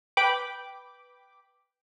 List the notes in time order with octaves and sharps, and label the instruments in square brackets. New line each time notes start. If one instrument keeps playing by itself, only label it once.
[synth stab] B4 G5 B5 D6